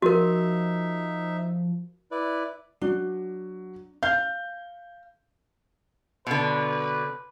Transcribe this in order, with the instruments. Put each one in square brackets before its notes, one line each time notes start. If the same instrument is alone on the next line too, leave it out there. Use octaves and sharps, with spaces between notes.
[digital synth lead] F3 [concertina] D#4 E5 [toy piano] F#4 A#4
[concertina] E4 B4 D5
[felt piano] F#3 [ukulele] D4
[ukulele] F5 [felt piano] G6
[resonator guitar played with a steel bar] B2 D3 [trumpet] B4